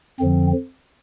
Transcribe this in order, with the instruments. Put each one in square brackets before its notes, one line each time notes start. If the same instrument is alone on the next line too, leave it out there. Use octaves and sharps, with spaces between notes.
[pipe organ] F2 D3 F3 C4